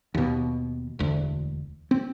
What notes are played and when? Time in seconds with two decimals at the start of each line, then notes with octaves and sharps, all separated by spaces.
0.14 D#2 B2
0.99 E1 D2
1.91 C4